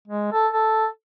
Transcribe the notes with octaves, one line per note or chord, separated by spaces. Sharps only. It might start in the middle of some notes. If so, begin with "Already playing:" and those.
G#3
A4
A4